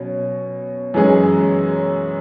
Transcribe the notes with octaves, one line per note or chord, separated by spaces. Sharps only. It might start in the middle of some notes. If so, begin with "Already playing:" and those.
Already playing: B2 F#3 C#4
F#2 E3 G#3 C#4 G#4